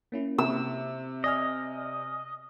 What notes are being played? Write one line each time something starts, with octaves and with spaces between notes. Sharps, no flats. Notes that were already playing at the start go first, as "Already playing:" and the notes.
A#3 C#4 E4
C3 E6
D5 D#5 G#5 F6